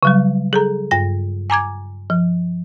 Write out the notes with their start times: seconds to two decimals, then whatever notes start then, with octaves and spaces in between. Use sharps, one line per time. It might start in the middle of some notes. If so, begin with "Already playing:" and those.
0.03 C#3 F#3 G3
0.53 G#4 A4 A#5
0.91 G2 A#6
1.50 G#5 A#5 D6 G#6
2.10 F3